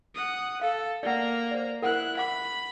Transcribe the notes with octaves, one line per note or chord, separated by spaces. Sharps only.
F#5 D#6
A4 F5
A#3 D5 F#5 A#5
C5 D5
E4 A#4 F#5 F#6
F#5 B5 D6